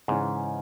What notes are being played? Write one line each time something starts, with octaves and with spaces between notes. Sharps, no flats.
G#2 C#3 E3 C#4